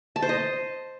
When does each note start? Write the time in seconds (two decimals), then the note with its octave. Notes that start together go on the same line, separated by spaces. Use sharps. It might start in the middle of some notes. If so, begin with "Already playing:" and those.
0.16 A5
0.22 C5
0.29 D#5